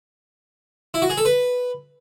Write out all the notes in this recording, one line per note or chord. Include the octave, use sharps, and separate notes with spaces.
E4
F#4
G#4
A4
B4